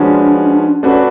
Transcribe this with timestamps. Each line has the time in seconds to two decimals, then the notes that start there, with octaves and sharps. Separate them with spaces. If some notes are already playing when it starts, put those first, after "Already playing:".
Already playing: F3 G#3 C#4 D4 F#4 B4
0.83 A3 C#4 D4 F#4 B4